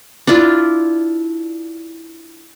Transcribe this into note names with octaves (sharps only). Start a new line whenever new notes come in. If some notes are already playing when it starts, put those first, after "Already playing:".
D4 E4 F4